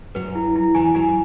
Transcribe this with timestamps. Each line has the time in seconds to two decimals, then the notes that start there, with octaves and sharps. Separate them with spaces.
0.15 F#2 F#3 B4
0.35 E4
0.56 E4
0.75 E2 E3 G#5
0.95 F#2 F#3 G#5